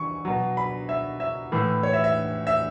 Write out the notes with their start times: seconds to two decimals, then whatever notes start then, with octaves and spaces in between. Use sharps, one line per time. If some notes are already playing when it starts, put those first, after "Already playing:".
Already playing: E3 C#6
0.25 B2 F#3
0.57 B5
0.89 E5
1.20 E5
1.52 A2 E3
1.83 C#5
1.93 E5
2.04 E5
2.47 E5